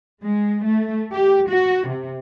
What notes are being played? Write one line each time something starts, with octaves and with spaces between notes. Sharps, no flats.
G#3
A3
G4
F#4
C3